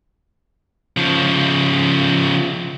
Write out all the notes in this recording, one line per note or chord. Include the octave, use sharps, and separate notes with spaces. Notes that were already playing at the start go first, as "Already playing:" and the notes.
C#3 F3